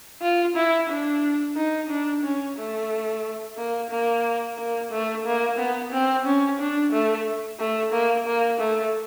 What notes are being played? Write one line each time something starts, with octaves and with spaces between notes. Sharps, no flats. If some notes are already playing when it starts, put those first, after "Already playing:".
F4
E4
D4
D#4
D4
C#4
A3
A#3
A#3
A#3
A3
A#3
B3
C4
C#4
D4
A3
A3
A#3
A#3
A3